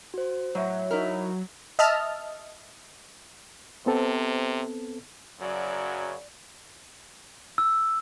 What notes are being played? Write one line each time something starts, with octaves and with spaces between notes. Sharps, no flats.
F#4 C5
A2 F#3 C#5 E5
D#4 E4 A#4
D#5 E5 A5 F6
C3 B3 C4 A4
F#2 C#3 F#3 D5
E6